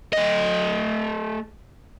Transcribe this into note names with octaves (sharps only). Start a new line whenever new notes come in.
A3 D#5